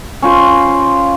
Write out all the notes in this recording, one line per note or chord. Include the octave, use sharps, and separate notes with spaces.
C#4 F4 C5